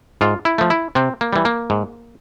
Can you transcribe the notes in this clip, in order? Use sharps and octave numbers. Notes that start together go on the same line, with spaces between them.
G#2 F4
E4
F3 A3
E4
C3 C4
A#3
E3 G3
A#3
G#2